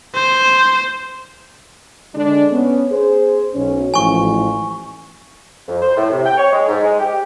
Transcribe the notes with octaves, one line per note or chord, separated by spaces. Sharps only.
C5
D3 G#3 D4
B3 C#4
G#4 C5
B1 C#4
A1 G#2 F3 G#5 C#6
F2
C5
A2
C3
G5
C#5
G#3
G#2
G#3
G4